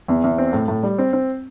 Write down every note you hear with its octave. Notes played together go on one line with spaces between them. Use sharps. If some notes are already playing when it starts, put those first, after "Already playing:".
E2
E2
C4
A2
A2
G3
C4
C4